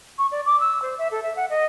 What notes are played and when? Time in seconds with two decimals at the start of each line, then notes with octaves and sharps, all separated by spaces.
0.18 C#6
0.31 D5
0.46 D6
0.60 E6
0.82 C5
0.98 E5
1.11 A4
1.23 E5
1.36 F#5
1.50 D#5